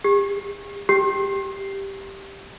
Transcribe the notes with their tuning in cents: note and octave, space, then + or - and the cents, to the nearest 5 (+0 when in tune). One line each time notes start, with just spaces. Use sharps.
G4 +45
G4 +0